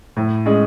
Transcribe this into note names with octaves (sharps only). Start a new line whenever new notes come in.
A2
G#3 C#4 G#4